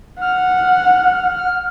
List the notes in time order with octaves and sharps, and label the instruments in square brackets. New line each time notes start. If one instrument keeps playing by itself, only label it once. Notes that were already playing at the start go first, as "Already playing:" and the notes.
[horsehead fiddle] F#5 [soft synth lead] F6